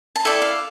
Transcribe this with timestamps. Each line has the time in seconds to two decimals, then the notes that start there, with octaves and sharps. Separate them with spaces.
0.16 A5
0.25 E4 A4 D5 G5
0.42 F5